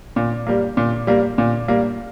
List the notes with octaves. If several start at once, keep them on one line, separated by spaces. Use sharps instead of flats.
A#2
G3 A#3
A#2
G3 A#3
A#2
G3 A#3